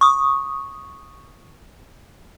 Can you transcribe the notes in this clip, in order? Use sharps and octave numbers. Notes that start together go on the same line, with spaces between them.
C#6 D#6